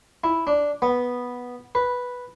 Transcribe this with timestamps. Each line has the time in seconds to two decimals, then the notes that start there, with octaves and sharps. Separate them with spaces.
0.24 E4
0.47 D4
0.82 B3
1.75 B4